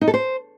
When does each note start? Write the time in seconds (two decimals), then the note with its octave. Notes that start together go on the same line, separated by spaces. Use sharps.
0.01 D#4
0.08 A4
0.14 C5